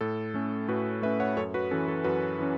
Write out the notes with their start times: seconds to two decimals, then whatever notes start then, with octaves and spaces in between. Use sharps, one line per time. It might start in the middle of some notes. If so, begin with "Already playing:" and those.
0.01 A2 A4
0.34 A3 C#4
0.68 A2 F#4 B4
1.02 A3 C#4 B4 E5
1.20 C#5 F#5
1.37 F#2 A4 C#5
1.54 F#4 B4
1.71 E3 C#4 A4
1.88 A4
2.04 F#2 F#4 B4
2.39 E3 C#4